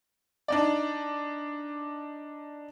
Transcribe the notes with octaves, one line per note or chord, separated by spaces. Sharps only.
D4 D#4 D5